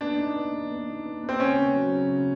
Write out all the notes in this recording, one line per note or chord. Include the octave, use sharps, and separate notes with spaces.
B3 D4
D#4
B3
B3
B3
D#4
B3
B3
C4
C#3 C#4
B3
F#3
C#3
C#3